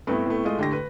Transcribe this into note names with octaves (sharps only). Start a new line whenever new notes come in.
G2 A3 B3 C4 E4
A2 A3
G#3 F4 D#5
D3 G4 A#6
B4